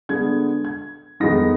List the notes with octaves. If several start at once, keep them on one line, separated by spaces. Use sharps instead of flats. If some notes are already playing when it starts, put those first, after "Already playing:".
D3 G#3 B3 G#6
G#6
F2 D#3 G#3 B3 D#4 A#6